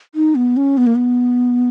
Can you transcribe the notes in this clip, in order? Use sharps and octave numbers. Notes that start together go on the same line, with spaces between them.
D#4
B3
C#4
B3
A#3
B3